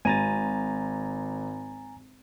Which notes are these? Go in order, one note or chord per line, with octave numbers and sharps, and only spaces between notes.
G#1 G#5 A#5 A6 D#7